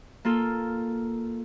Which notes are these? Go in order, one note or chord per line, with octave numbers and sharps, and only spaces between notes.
A#3 F4 A4